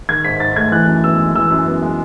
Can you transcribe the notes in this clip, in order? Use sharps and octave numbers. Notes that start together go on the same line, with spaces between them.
D#3 G#6
G#2 B6
G#2 A6
A3 G#6
E3 F#6
F#2
B3 E6
G#3
E3 E6
F#2
B3
G#3